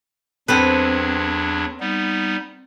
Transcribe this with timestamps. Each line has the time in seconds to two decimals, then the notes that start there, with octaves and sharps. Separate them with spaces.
0.48 E2 F#3 C4 D4 A4 B4
1.80 G3 B3 D#4